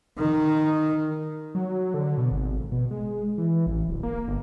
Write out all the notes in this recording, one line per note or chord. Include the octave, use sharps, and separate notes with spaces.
D#3
F#3
D3
B2
G#1
B2
G#3
E3
A1
D1
A#3
G1